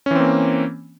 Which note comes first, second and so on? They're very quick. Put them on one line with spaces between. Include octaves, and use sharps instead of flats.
C#4 E3 C4 A#3